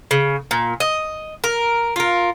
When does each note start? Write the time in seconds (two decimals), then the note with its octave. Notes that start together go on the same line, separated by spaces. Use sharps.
0.11 C#3
0.51 A#2
0.80 D#5
1.44 A#4
1.96 F4 A#4